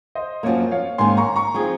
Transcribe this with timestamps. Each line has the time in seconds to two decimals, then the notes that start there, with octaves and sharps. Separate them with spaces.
0.15 C5 D#5
0.43 F#2 F3 A#3 C#5
0.71 C#5 F5
0.98 G#2 D#3 A#3 C#4 G#5 C6
1.17 A#5 C#6
1.36 A#5 C#6
1.54 F3 C4 D#4 G#4